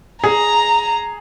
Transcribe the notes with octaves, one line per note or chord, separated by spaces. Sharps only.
G#4 A#5